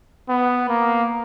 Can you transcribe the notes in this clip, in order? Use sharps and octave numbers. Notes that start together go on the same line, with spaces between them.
B3
A#3